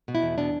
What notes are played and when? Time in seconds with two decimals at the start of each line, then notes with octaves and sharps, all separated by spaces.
0.08 B2
0.15 E4
0.22 E2
0.38 B2 D4